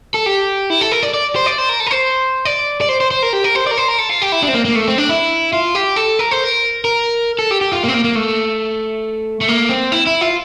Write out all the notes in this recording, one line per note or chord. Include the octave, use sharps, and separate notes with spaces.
A4
G4
E4
A4
A#4
D5
D5
C5
D5
C5
A#4
A4
A#4
C5
D5
D5
C5
C5
C5
A#4
G4
A#4
C5
D5
A#4
C5
A#4
A4
F4
G4
E4
D4
C4
A#3
A#3
A3
C4
D4
E4
F4
G4
A4
A#4
C5
A#4
A#4
A4
G4
G4
F4
A#3
C4
A#3
A#3
A3
A3
A#3
C4
E4
E4
F4